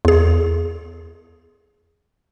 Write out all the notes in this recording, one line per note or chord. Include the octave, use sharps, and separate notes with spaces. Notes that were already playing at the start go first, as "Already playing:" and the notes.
E2 G#4